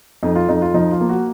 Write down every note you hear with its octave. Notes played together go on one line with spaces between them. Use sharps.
F2 D#4
F4
F2 D#4
F4
F3 D#4
F4
A#3
F#4